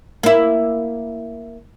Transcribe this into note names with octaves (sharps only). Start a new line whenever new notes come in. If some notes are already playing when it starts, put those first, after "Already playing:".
A#3 E4